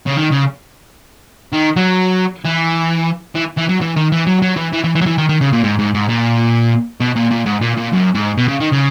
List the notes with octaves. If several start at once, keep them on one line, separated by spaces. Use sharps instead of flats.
C#3
D#3
C#3
D#3
F#3
E3
E3
E3
F#3
E3
D#3
E3
F#3
F#3
E3
E3
E3
E3
F#3
E3
D#3
D#3
C#3
A#2
G#2
G#2
G#2
A#2
B2
A#2
A#2
G#2
A#2
A#2
F#2
G#2
B2
C#3
D#3
C#3